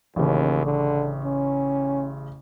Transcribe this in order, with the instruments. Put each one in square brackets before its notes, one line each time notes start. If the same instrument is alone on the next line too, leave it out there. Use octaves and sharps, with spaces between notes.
[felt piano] A1 C#3 [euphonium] D#2
[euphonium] D3
C#4